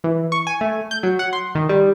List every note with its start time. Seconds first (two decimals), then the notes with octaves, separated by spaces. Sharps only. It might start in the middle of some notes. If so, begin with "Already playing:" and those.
0.04 E3
0.32 C#6
0.47 G#5
0.61 A3
0.91 G6
1.03 F#3
1.19 F#5
1.33 C6
1.55 D#3
1.69 G3